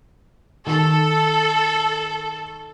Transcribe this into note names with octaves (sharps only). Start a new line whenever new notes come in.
D#3 A4